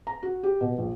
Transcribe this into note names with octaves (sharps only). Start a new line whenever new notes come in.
A#5
F#4
G4
B2
A#1